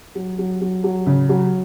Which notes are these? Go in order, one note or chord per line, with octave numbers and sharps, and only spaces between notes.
F#3
F#3
F#3
F#3
C#3
F#3